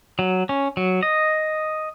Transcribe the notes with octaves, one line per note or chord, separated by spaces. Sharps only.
F#3
C#4
F#3
D#5